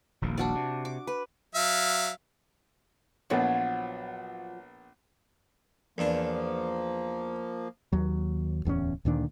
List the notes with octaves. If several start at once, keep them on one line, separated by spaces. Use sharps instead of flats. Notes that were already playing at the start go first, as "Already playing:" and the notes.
D#1 A#1 A#2
D4 F#4 D5
C3
D6
B4
F#3 E5 F5
A#1 F3 F#3 B3 C#5
E2 F3 A#3 D4
D#2 F#3
D1 E2 C4 C#4
D2 A#2 D#3 D4